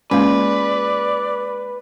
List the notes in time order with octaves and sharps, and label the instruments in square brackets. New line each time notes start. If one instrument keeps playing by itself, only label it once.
[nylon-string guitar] G#3 F4 [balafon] A#3 C#4 [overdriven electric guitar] B4 [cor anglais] D5